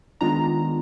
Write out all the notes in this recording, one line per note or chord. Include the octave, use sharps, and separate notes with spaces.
D#3 G#3 B3 D4 F4 A#5